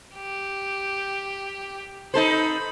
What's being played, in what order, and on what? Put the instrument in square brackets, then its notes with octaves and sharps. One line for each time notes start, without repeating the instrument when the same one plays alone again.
[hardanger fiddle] G4
[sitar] D#4 A4 C5 [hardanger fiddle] B5